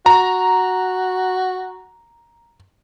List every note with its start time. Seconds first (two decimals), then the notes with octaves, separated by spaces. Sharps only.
0.06 F#4 A#5